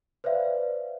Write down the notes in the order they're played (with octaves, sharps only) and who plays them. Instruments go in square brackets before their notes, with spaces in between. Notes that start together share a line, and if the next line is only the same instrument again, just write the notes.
[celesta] B4 C5 D5 E5 F5